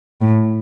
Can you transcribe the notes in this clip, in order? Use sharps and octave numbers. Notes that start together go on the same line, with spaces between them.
A2